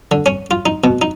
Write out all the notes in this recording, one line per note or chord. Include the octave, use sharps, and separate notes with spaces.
D3
C#4
F4
D#4
B2
D#4